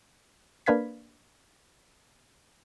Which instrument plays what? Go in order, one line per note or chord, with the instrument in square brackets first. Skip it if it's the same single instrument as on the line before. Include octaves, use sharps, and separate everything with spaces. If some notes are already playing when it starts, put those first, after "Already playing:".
[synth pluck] A#3 D4 B4 F5 G#6 B6